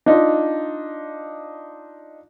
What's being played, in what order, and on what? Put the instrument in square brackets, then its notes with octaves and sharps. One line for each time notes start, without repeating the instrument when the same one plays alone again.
[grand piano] D4 D#4 F4